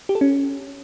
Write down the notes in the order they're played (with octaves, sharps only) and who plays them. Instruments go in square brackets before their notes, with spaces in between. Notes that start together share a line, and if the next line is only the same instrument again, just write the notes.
[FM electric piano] G4
A4
C#4